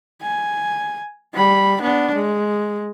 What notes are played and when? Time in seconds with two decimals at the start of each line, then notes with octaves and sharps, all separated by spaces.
0.22 G#5
1.34 G3 B5
1.82 B3 D4
2.15 G#3